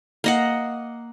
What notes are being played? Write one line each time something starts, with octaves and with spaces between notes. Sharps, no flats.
A#3 D#5 F#5